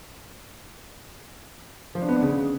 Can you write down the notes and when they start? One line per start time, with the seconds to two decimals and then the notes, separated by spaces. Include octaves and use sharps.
1.95 F3
2.02 D4
2.09 B3
2.15 D4
2.22 C#3